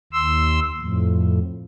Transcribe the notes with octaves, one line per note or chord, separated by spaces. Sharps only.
D#2 C6 E6
F2 A2